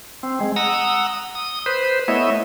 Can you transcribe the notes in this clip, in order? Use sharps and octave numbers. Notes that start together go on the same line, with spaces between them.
C4
G#3
F#5 A#5 D#6 E6
D#6
B4 C5
A3 B3 E4 C#5 D#5 E5